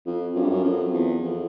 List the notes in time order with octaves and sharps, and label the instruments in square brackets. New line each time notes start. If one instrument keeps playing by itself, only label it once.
[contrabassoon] F2
F#2
G2
F#2
F2
E2
F2